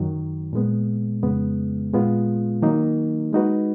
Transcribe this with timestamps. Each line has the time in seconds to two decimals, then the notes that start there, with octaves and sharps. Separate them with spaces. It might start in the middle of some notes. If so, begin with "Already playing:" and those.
Already playing: F#2 D#3 F#3
0.53 A#2 G#3 B3
1.23 F2 C#3 G#3 B3
1.93 A#2 G#3 B3 F4
2.62 D#3 F#3 A#3 D#4
3.33 G#3 D#4 F#4 B4